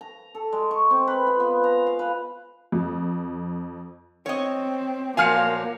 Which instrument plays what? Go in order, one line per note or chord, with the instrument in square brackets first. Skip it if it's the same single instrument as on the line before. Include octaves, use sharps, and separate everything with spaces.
[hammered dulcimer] A#5
A4
G#3
C#6
C4
B4
F4
B3
A#5
F5
B4
[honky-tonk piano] F2
[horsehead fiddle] C4 [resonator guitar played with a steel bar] C#5 D#5
[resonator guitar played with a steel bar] A#2 F3 F#3 [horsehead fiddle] A#3 [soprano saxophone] F5 [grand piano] G#5 F6 C#7